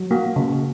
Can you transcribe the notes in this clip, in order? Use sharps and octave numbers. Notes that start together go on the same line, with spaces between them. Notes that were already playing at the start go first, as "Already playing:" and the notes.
Already playing: F#3
A#3 F#4
C#3